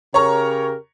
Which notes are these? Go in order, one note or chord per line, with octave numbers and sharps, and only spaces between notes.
C#3 G4 A#4 C#5 A#5 C#6